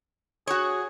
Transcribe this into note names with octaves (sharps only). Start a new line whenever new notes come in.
F#4 G#4 C#5